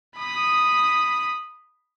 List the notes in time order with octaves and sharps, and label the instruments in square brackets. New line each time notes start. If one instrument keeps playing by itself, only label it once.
[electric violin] B5 D#6